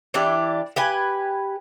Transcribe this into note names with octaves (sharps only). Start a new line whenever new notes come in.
E3 D4 G4 D5
G4 B4 G#5